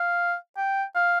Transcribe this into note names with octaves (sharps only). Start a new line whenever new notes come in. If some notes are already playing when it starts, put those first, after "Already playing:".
Already playing: F5
G5
F5